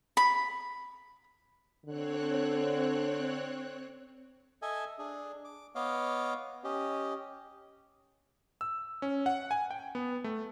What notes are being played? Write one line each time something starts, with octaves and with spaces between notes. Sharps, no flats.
B5
D3 C4 C#5 F#6
A4 D#5 E5 G#5
D4 G#4
D6
B3 C#5 D#5 F5 D6
C#4 G4 D#5
E6
C#4
F#5
G#5
G5
B3
A3